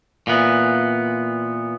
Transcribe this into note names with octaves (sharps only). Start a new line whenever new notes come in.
A#2 E3 B3